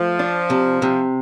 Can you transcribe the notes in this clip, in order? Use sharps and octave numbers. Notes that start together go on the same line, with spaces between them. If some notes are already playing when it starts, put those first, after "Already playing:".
Already playing: F3 A3
D4
C3
C3